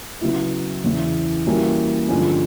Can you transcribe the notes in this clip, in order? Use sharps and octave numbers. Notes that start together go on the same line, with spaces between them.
C#3 F#3 B3 E4
E2 C#3 E3
E3 G3 A#3 C#4 F#4
G2 D3 F3 G#3 C#4